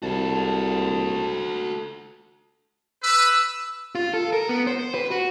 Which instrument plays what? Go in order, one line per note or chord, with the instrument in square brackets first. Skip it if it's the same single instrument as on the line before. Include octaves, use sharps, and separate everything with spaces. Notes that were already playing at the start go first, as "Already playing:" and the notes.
[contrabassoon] C2 [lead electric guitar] F#4 A4 [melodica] A5
[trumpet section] B4 [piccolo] E6
[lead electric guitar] F4
A4
A#4
B3
C5
B4
F#4